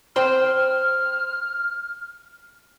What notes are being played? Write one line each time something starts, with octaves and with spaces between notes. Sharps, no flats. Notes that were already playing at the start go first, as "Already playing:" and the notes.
C5 G5 C6 F6